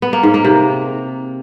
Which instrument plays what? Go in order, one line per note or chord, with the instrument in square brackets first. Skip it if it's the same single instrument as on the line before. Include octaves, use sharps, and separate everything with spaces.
[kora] B3
A#3
G#2
A#3
C3